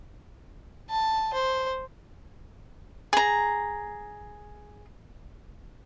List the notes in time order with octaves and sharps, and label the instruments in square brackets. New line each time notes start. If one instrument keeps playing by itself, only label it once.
[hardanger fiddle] A5
C5
[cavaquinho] G#4 A#5